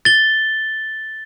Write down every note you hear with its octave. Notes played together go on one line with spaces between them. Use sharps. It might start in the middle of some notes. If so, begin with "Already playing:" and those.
A6 G7